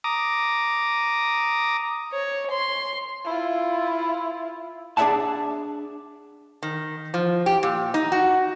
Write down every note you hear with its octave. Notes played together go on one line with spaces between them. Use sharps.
A#5 D6 D#6
C#5
C6
E4 F4
D4 G#4 D5 E5 F#5 A5
D#3
F3
G4
A#2
D#4
F#4